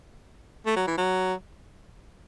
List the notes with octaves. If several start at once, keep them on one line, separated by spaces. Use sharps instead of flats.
A3
F#3
E3
F#3